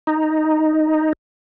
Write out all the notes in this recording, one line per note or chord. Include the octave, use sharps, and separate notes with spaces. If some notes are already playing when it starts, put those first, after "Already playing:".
D#4